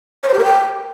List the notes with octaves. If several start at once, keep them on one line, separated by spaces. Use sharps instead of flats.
C#5
C5
G4
A#4
G5